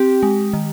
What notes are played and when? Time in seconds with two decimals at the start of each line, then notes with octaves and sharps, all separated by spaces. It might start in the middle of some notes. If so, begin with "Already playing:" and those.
Already playing: C4 G4
0.23 G#3
0.53 D#3